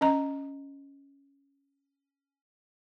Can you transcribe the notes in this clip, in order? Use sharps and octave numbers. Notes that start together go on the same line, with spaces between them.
C#4 D#5 A#5